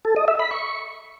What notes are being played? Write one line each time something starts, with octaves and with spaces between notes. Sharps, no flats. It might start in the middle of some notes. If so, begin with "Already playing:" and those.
A4
D#5
E5
B5
C#6